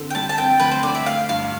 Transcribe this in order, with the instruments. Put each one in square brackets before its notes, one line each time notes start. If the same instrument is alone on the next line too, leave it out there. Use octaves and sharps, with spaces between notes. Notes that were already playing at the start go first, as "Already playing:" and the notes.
Already playing: [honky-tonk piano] D3 C4
[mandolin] G5
[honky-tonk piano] G3 [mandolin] A5
[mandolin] A5
[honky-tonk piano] C4 [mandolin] G5
[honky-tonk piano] D2 [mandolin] B4
[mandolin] C5
[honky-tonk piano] D3 [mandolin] D5
[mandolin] E5
[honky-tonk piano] A3 [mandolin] F5
[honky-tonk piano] G2 [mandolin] F5